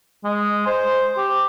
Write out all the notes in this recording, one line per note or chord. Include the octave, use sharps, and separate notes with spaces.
G#3
C5
G4